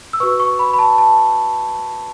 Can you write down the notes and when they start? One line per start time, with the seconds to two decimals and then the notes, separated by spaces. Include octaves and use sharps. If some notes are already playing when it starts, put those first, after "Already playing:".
0.13 E6
0.20 F#4 B4 C#6
0.40 C#6
0.59 B5
0.73 B5
0.79 A5
0.98 A5